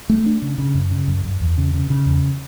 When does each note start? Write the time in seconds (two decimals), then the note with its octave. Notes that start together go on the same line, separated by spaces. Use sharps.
0.10 A3
0.26 D4
0.42 C#3
0.58 C#3
0.75 F#2
0.91 C#3
1.08 F#2
1.24 F#2
1.41 E2
1.58 C#3
1.74 C#3
1.90 C#3
2.06 E2